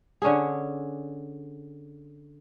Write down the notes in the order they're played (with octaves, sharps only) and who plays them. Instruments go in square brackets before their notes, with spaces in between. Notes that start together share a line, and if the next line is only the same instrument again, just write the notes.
[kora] D3 C#4 D4 G#4